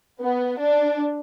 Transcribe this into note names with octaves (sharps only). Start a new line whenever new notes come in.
B3
D4